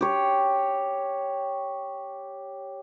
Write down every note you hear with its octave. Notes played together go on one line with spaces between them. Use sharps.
G4 C#5